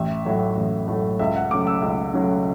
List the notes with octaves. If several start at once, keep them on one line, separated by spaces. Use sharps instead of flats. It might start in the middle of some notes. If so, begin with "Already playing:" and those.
Already playing: A1 E5
A2 F#3 A3
A1
A2 F#3 A3
C#2 E5
F#5
C#3 F#3 A3 D6
E6
C#2
C#3 F#3 A3